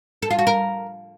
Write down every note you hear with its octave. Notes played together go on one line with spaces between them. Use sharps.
A4
F4
F#4
A#4